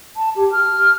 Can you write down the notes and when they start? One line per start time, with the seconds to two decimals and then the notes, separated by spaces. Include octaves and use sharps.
0.17 A5
0.36 G4
0.52 F6